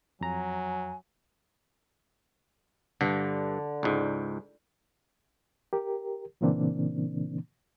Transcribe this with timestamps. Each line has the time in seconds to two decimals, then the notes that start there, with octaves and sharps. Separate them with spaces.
0.21 F2 F#3 G#5 A#5
3.01 G2 D3
3.83 C#2 G#2
5.73 G4 A#4
6.41 A#2 C#3 E3 A#3 C4 D4